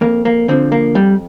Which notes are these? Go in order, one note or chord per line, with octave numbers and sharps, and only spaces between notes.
F2 A#3
A#3
D3 F3 C4
A#3
F2 G3